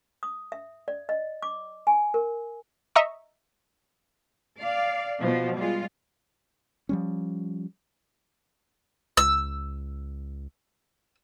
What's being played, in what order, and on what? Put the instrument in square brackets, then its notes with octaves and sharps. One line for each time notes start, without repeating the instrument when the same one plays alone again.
[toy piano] D#6
E5
D5
D#5
D6
G#5
A#4
[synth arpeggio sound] D#5 E5 A#5 C#6
[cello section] D5 F5
B2 F3
G3 G#3 F4
[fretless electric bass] F3 G3 C#4
[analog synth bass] C#2 [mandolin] E6